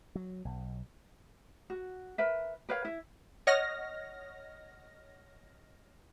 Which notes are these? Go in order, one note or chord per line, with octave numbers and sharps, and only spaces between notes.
F#3
B1
F#4
A#4 B4 E5
A#4 B4 C#5 F5
E4 E5
C#5 D#5 F#5 F6 A#6